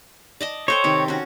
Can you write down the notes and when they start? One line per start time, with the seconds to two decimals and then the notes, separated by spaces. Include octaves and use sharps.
0.41 D5 D#5 A5
0.68 A4 C5 C#5 G5
0.84 C3 D#3
1.08 C#4 F#4